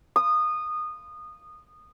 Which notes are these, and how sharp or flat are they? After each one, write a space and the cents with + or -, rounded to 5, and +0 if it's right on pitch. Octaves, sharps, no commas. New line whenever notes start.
D#6 -20